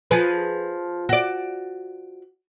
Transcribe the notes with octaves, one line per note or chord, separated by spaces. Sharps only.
F3 G#4 B4
F#4 D5